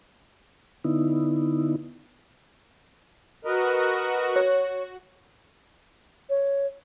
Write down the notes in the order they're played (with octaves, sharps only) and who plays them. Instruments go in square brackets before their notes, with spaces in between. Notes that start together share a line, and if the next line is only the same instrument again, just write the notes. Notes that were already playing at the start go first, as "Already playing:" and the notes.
[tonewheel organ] D3 B3 D#4 E4
[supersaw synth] F#4 [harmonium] A#4 B4 D#5
[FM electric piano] C#5
[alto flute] C#5